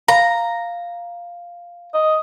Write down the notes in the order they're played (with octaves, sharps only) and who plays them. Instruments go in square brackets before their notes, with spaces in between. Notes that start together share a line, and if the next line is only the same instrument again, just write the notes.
[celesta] F5 [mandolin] A#5
[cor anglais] D#5